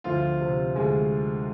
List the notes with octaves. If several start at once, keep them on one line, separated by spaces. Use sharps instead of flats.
D2 F3 F4
C3
D2 G#3 G#4